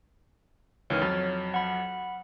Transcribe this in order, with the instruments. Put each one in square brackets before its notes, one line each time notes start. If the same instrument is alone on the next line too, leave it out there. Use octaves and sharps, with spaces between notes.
[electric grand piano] C#2 D#3 E3 [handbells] C#5 F6
[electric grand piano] F2 F#3 [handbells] A6
[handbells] F#5 B5